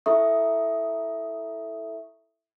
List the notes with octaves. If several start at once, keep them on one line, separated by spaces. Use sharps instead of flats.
E4 A4 E5 C#6 D#6